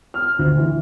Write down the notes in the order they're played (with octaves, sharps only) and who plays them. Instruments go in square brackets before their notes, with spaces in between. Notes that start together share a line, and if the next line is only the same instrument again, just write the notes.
[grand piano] F6
D2
E3